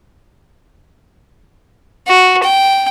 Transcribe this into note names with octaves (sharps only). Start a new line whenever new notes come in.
F#4
G5